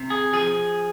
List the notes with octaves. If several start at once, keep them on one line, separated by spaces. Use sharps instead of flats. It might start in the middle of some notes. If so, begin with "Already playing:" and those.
Already playing: C3
G#4
F3 G#4